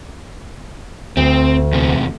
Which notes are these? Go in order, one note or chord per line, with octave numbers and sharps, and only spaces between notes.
D2 C4
E2 C3 B3